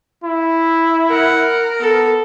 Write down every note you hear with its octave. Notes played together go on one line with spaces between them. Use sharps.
E4
A#4 F#5
B3 A4